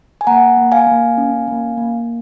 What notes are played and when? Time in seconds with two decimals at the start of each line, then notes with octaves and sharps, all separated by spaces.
0.21 G#5
0.27 A#3 F#5 A#5
0.57 A#3
0.72 F5 G#5
0.87 A#3
1.18 C#4
1.48 A#3
1.77 A#3